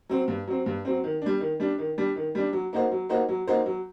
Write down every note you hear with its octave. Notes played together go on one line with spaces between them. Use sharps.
F#3 C4
G2
F#3 C4
G2
F#3 C4
D#3
G3 D4
D#3
G3 D4
D#3
G3 D4
D#3
G3 D4
F#3
A#3 D#4 F#4 C5
F#3
A#3 D#4 F#4 C5
F#3
A#3 D#4 F#4 C5
F#3